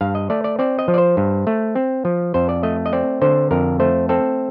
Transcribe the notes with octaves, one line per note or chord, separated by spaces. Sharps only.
G2 F5
D#5
A3 D5
D5
C4 D5
D#5
F3
D5
C5
G2
A3
C4
F3
F2 C5
D5
A3 D#5
D#5
C4 D5
D3 C5
F2 A#4
A3 C5
C4 A4